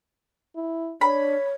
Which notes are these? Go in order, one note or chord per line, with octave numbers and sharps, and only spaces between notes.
E4
D4 C#5 B5